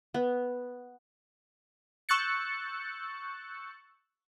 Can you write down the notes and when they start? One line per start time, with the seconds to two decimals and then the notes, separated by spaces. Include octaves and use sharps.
0.14 B3
2.09 C#6 E6 F#6 G6 A6 C#7